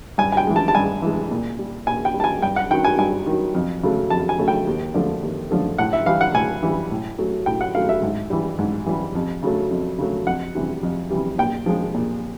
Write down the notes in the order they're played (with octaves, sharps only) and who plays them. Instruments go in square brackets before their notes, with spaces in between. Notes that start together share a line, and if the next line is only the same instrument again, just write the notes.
[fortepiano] G2 G#5
G#5
G5
E3 G#3
A5
A5
G2 G#5
E3 G#3
A#2
G3
A#2 G#5
G5
G3
A5
G#5
G2 G5
F#5
D#3 F#3 G5
G#5
G2 G#5
D#3 F#3
F2
C#3 F#3 A3
F2 A5
G#5
C#3 F#3 A3
G5
D#2
D3 F3 A3
D#2
D3 F3 A3
A2 F#5
E5
E3 G3 F5
F#5
A2 G#5
E3 G3
A2
F#3 A3
A2 G5
F#5
F#3 A3 F5
E5
G#2
E3 G3
G#2
E3 G3
F2
C#3 F#3 A3
F2
C#3 F#3 A3
F2 F#5
C3 E3 G3
F2
C3 E3 G3
A#2 G5
F3 G#3
A#2